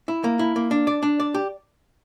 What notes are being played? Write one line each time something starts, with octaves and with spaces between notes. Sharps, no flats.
E4
A#3
E4
A#3
D4
D5
D4
D5
G4